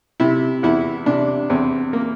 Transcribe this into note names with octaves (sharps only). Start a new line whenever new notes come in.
C3 E4
E2 E4
C3 D4
E2 C4
A#3